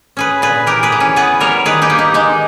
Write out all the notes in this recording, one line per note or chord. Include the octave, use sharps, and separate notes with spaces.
C#4 G#4 B4
A#2 G#4 B4
E3 G4 A#4
G#4 B4
E3
C#4
B3 G#4 B4
G3 A#4 C#5
D#3 G#4 B4
D#4 G4
A#3
D#4
G#3 D#4